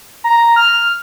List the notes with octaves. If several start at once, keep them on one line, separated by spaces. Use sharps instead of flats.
A#5
F6